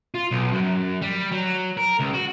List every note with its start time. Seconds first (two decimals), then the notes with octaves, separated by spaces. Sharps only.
0.15 F4
0.31 B1
0.53 F#2
1.02 G3
1.31 F#3
1.77 A#4
1.99 C#2
2.14 F#4